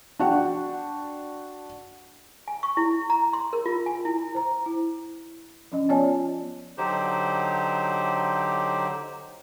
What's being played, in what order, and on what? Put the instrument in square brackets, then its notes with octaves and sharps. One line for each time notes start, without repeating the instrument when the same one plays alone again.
[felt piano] D4 F#4 F#5 G5
[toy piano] G#5
C#6
E4
A#5
C6
A#4
F4
G#5
E4
[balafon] C5 A#5
E4
F3 C#4 D#5
B3 F4 C#5 D5 G#5 A5
[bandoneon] D3 F#3 D#4 G4 C5